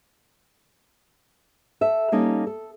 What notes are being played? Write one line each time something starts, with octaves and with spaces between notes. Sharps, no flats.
A4 E5
G3 A#3 C#4 D#4 A4
A4